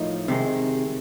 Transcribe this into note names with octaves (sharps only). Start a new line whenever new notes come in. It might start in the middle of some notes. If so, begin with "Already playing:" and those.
Already playing: A2 F3 A#3 D#4
C3 D#3 G#3